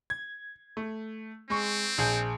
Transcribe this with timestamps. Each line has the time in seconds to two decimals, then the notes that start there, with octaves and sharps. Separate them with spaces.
0.10 G#6
0.77 A3
1.50 G#3 C4 C#6
1.98 A#1 G#4 G6